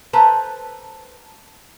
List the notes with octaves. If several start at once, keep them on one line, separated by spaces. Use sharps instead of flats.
A4 B4 C5 A5 A#5